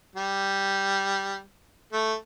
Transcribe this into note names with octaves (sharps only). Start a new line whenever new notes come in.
G3
A3